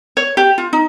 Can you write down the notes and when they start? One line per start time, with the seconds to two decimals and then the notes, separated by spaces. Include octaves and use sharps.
0.17 C#5
0.37 G4
0.58 F4
0.73 D#4